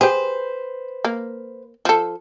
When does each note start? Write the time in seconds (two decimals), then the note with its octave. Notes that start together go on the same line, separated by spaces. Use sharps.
0.01 G4 G#4 B4 C5
1.05 A#3
1.85 F3 A4